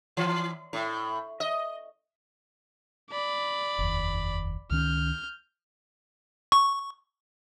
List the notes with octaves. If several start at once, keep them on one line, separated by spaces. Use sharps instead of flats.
E3
A2
D#5
D5 B5
F1 D#2
C#2 D#3 C#4 F6 G6
C#6